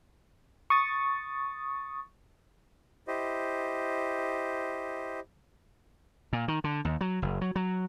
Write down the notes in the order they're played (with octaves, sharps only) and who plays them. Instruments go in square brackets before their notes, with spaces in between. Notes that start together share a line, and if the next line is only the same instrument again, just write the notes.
[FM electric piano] C#6 D#6 A6
[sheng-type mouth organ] E4 G4 C5 D#5
[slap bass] A#2
D#3
D3
D#2
F#3
F#1
F#3
F#3